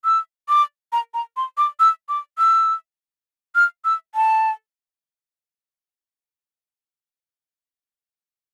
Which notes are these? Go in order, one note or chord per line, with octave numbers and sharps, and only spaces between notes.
E6
D6
A#5
A#5
C6
D6
E6
D6
E6
F6
E6
A5